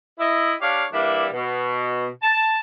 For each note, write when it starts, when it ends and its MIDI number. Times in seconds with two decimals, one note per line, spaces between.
0.20 0.54 64
0.20 0.54 75
0.61 0.84 62
0.61 0.84 67
0.61 0.84 73
0.61 0.84 74
0.61 0.84 77
0.92 1.27 52
0.92 1.27 55
0.92 1.27 58
0.92 1.27 62
0.92 1.27 64
1.33 2.08 47
2.22 2.60 81